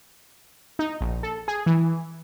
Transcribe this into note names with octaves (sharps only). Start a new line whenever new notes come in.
D#4
A#1
A4
G#4
E3